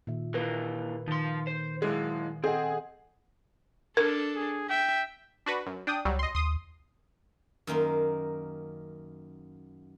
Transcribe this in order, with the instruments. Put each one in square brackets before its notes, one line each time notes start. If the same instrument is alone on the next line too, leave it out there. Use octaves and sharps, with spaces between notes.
[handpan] A#2 D#3 E5
[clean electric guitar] E3 A#3 [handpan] A#4 B4
[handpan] D#3 [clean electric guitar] F3 C6
[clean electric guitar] C5
[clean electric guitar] F#3 E4 [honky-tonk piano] G#3
[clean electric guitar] C4 [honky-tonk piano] G#4 [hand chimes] A4 D#5 F#5
[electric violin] D4 A4 [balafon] A#4
[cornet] G#4
[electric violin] E5 [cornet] G5
[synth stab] D4 F#4 B4
F#2
D4 G5 D#6
[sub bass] C#2 [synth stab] F#3 G3
[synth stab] D#5 C6
[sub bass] D#2 [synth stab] C6 D#6
[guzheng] F#2 D#3 A#3 C6